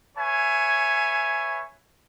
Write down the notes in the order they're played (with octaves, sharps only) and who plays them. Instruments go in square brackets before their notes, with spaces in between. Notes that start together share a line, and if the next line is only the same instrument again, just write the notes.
[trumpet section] B4 C#5 E5 G#5